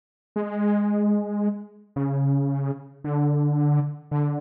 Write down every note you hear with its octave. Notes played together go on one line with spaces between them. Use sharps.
G#3
C#3
D3
D3